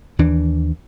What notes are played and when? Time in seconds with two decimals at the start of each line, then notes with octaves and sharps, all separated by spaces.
0.19 D#2 E3 D4